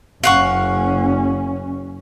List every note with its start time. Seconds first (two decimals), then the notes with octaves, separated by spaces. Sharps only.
0.23 F#1 C#4 F5 F#5 C#6